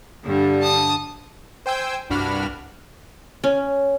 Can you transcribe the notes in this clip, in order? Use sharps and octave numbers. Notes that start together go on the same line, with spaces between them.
G2 D3 G3
A5 D#6
C5 G5 G#5 E6 G6
C2 G2 D4 F#4 B5 F6
C#4